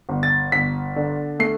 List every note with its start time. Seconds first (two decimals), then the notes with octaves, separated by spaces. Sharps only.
0.09 G1
0.23 A6
0.52 G1 B6
0.96 D3
1.39 A3 C7